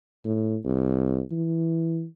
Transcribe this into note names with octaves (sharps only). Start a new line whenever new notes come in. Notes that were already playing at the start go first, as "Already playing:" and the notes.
A2
C2
E3